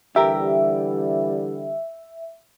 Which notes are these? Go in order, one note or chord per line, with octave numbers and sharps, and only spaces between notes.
D3 E3 G3 G4 A#4 E5